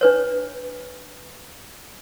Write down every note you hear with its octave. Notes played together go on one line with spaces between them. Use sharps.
D4 B4 C#5